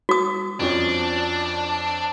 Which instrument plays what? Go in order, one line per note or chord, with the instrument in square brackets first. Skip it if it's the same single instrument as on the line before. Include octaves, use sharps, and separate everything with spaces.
[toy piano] F#4 D#6
[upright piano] F2 F3 C#4 [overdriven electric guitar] D4